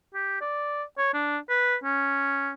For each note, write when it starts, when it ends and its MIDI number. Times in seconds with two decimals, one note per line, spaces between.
0.15 0.40 67
0.41 0.83 74
0.98 1.12 73
1.14 1.38 62
1.49 1.76 71
1.84 2.52 61